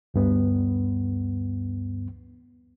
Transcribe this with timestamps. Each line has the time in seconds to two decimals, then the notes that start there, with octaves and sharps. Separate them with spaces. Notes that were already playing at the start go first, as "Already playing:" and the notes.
0.14 D2 G2 B3